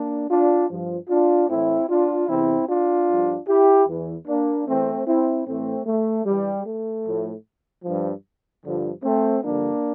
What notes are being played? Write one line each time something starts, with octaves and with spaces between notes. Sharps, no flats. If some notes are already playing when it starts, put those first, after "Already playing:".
Already playing: A#3 D4
D4 F4
G2 F3
D4 F4
A2 E3 C4 E4
D4 F4
E2 C3 E3 C4 E4
D4 F4
G2 F3
E4 G4
E2 E3
A#3 D4
E2 E3 A3 C4
C4 E4
A2 E3 A3 C4
A3
G2 E3 G3
A3
A2 F3
G2 F3
G2 D3 F3
A3 C4
G2 D3 F3 A#3 D4